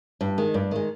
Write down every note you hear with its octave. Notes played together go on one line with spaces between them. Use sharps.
G2
D#3 G#3
G2
D#3 G#3